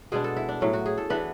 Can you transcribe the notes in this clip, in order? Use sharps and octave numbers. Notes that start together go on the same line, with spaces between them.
B2 G#3 B3 D4 G#4
A4
E4
D4
A2 F#3 C#4
F#4
G#4
A4
E3 B3 D4 B4